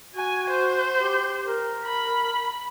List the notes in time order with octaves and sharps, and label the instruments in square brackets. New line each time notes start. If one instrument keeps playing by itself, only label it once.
[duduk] F#4 [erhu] G#5
[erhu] C5
[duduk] G4
A#4
[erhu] B5